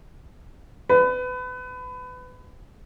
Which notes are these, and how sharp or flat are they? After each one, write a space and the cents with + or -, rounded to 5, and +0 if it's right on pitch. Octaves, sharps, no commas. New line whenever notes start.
B4 +25